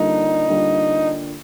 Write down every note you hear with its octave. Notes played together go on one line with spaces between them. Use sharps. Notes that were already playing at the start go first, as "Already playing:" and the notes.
Already playing: D3 G3 A#3 D4 D#4 F4
D3 G3 A#3 D4 F4